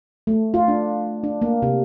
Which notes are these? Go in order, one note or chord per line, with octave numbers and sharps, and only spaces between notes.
A3
F4
D4
D4
A#3
C3